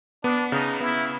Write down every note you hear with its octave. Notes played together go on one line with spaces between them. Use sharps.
B3 D4
C#3 D#4
B3 E4